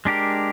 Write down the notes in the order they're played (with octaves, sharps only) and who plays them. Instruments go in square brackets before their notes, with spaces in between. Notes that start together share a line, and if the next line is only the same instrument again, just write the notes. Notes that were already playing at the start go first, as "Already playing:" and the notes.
[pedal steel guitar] G#3 D4 G4 A#4